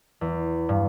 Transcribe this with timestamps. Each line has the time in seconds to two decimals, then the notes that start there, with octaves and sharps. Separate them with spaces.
0.21 E2
0.69 G2